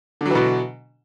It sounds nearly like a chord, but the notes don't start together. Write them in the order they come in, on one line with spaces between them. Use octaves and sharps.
D3 F#3 E3 B2